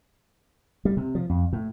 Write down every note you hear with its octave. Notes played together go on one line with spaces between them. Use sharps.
G3
C3
F3
F2
A2